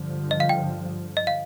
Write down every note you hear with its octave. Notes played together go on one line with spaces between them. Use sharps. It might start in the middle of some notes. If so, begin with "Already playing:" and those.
Already playing: G2 D3 F3
D#5
F5
G5
D#5
F5